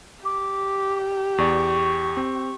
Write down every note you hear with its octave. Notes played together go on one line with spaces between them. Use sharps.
G4 D6
E2 D5 C#6
C4